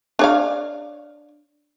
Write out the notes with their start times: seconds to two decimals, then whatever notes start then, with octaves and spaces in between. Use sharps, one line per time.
0.19 D4 C#5 F5